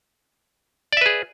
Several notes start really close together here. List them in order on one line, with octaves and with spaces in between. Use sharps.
D5 E5 B4 G#4